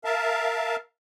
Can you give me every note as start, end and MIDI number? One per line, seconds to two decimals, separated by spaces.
0.05 0.76 70
0.05 0.76 76
0.05 0.76 77
0.05 0.76 81